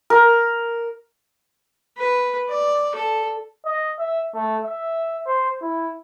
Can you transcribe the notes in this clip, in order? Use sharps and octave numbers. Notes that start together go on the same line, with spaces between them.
A#4
B4
D5
A4
D#5
E5
A3
E5
C5
E4